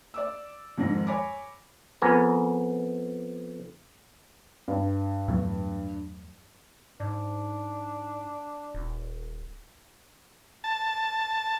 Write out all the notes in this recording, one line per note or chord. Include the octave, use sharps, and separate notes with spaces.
D5 D6 E6
F2 G#2 D#3 A#6
C#5 G#5 B5 D6
F2 B3 A#4 G#5
G2
E2 A2 F#3
G#2 D4
D#1
A5